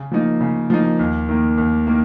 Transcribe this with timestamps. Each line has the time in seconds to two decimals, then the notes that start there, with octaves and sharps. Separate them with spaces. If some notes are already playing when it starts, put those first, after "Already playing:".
Already playing: C#3
0.11 F3 A#3 D#4
0.41 C#3
0.70 F3 A#3 D#4
0.99 D#2
1.29 D#3 A#3
1.58 D#2
1.87 D#3 A#3